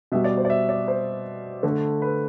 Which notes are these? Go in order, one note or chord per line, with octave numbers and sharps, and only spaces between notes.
B2 G3 E5
D5
C5
D5
E5
D5
C5
D3 A3
B4